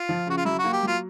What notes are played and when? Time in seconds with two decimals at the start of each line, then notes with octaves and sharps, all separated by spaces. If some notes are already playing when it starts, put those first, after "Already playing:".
Already playing: F4
0.09 F3
0.27 C#3 F#4
0.37 F4
0.45 F#3 E4
0.59 F#4
0.64 A#3
0.73 G4
0.83 F#3 F4